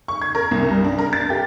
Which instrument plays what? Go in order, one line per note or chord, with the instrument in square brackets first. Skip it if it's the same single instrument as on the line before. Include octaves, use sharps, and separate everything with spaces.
[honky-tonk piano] C#6
G#6
A#4
C2
G2
D4
A#4
A6
G4